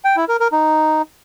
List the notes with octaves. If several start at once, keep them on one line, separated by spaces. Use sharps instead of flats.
G5
E4
A#4
A#4
D#4